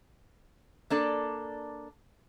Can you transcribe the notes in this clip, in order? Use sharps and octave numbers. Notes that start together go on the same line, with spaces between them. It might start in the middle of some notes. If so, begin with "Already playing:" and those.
A#3 D4 A4 D5